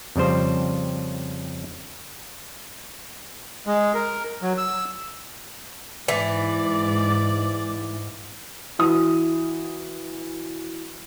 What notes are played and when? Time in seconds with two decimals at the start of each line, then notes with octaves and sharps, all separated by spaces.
0.16 F2 C#3 G3 C5
3.67 G#3
3.95 A#4
4.42 F#3
4.58 E6
6.08 G#2 E3 D5
8.79 E3 F#4 D#6